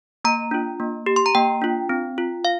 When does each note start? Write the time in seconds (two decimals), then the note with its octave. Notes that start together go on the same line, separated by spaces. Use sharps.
0.25 A#3 A#5
0.51 D4 F4
0.80 A#3
1.06 G4
1.16 C6
1.26 A#5
1.35 A#3 G5
1.62 D4 F4
1.89 C4
2.18 F4
2.45 F5